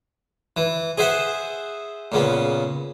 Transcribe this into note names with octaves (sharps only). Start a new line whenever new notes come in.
E3
G#4 C5 E5 F#5
A#2 C#3 B3